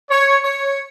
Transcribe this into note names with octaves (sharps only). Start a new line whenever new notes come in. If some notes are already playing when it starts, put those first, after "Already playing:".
C#5
C#5